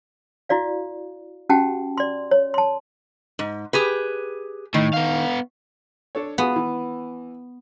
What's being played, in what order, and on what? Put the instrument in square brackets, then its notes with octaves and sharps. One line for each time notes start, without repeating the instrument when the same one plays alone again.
[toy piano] E4 F#4 D5 F5
C#4 F#4 G4 F#5 G5 A5
D5 C6
C#5
A5 C6
[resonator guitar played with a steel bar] G#2
G4 G#4 B4
[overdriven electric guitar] A2 [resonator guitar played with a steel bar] D#3
[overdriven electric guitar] B3 F5
[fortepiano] D4 A4 C#5
[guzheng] B3 [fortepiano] F4 F#4 G#4
[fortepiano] E3